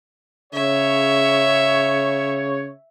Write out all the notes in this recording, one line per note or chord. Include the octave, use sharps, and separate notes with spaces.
C#3 C#5 E5